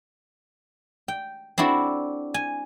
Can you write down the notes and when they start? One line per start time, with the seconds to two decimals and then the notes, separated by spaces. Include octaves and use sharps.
1.08 G5
1.58 C4 D4 E4 F#4 A4
2.34 G#5